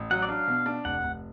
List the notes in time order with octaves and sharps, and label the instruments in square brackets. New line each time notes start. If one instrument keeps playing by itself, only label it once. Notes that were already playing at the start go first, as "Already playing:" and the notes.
Already playing: [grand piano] A1
[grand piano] F#3 [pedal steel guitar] F#5
[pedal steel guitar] D5
[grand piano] D4 [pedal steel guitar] F5
[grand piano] B2
D4
[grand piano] F1 [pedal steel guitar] F#5
[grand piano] F1